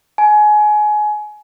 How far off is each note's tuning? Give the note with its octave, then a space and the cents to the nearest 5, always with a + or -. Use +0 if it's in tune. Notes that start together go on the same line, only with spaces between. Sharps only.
G#5 +25